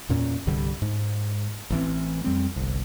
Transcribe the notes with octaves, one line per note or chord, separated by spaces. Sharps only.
E2 A#2 C#4
C2 G2 D3 G3
G#2
A1 E3 C4
F2 G3 C4
G1 C2